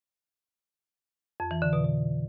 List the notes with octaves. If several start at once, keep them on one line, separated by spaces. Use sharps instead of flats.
F2
E3
D3
B2
B2